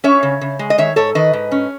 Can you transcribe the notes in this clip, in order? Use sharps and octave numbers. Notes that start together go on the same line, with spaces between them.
C#4 C#5 E5
C#3
C#3
G#3
D#5
D#3 C#5 E5
G#2 A4 C#5
D#3 B4 D#5
G#2
C#4